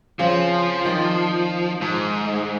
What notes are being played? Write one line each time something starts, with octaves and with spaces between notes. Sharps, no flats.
C#3 F3 C4
D#3 D5 G5
G#2